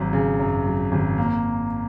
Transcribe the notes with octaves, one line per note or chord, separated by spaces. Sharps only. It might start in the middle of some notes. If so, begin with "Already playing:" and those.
Already playing: G#1 F#3
C#3
F#2
F#3
G#1
A#3